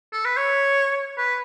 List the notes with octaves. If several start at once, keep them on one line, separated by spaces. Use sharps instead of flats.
A4
B4
C#5
B4